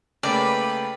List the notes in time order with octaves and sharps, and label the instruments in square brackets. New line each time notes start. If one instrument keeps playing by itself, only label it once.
[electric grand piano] C#3 A3 A#3 [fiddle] B4 [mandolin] D5 [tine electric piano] G5 A5